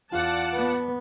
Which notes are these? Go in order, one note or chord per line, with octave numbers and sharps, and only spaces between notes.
E2 F4 D5 F#5 A5
B3